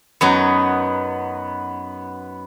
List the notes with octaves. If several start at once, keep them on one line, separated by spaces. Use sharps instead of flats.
F#2 F#3 B3 D#4